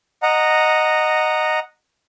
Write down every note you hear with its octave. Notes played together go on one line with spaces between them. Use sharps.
D#5 F#5 A#5